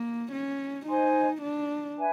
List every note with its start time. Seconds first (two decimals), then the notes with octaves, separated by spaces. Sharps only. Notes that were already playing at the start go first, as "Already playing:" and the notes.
Already playing: A#3
0.32 C#4
0.87 D#4 C5 D#5 G#5 C6
1.42 D4
1.97 B4 E5 G#5